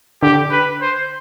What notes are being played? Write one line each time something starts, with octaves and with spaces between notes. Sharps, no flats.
D3 G4
B4
C5